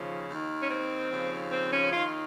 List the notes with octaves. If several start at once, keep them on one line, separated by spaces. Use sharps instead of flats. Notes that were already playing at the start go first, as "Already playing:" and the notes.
Already playing: D#2 C#3 F3
D#2 D#3
C#4
C4
D#2 C#3 F3
C4
C#4
D#2 D#3 F4